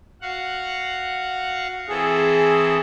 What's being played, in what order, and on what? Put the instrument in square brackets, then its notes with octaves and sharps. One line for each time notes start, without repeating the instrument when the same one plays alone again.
[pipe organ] F#4 F5 F#5
[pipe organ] E3 C4 A4 [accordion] G#4